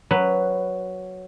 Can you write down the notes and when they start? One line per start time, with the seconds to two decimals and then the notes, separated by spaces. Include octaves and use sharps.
0.11 F#3 B4